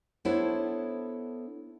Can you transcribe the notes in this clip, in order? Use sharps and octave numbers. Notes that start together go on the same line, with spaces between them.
B3 D4 E4 A4 C5 C#5